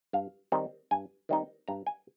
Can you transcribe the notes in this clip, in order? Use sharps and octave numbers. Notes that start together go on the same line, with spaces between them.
G2 F5
D#3 G3 C4 D#4
G2 G#5
D#3 G3 C4 D#4
G2 A#5
G#5